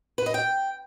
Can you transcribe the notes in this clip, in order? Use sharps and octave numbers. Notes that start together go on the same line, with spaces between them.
B4
D#5
G5